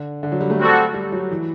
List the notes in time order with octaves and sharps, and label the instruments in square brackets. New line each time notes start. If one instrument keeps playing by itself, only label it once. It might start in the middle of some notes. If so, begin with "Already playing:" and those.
Already playing: [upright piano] D3
D3
F#3
G3
A3
[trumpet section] G3 C4 F#4 A4 D5
[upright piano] G3
F#3
E3